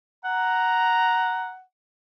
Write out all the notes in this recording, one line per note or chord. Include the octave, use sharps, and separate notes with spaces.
F#5 A#5